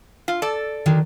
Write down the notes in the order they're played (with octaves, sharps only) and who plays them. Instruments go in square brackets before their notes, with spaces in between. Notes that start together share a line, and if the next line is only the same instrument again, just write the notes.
[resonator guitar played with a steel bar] F4
A4 D5
[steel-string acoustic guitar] D3 D#3 F#3